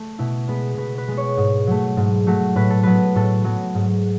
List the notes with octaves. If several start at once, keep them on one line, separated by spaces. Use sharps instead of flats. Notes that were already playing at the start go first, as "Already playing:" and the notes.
Already playing: A3
B2 E4
G#3 B3 B4
B2 B4
B4
G#3 B3
C#5
G#2
F#3 A3
G#2
F#3 A3
A2 B4
A4
F#3 B3 B4
A2 A4
F#3 B3
G#2